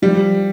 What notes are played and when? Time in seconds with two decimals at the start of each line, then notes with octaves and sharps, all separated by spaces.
0.02 F3 G3